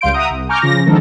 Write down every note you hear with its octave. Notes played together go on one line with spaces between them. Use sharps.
C#2 G3 F5 C6 G6 D7
E5 F#5 A#5 D#6
C2
G#5 A#5 C#6 D6 F6 G6
C#3 F3 A#6
D3 D#3 F3 G#3 A4 A#4